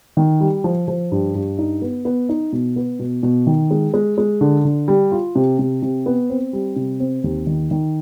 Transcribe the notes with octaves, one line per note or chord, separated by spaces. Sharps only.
D#3
G3
F3
F3
G2
G2
D#4
B3
B3
D#4
B2
B3
B2
B2
D#3
G#3
G#3
G#3
D3
D3
G3
F4
C3
C3
C3
B3
C4
G3
C3
C4
D#2
D#3
D#3